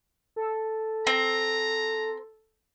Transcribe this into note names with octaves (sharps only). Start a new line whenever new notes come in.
A4
C4 A#5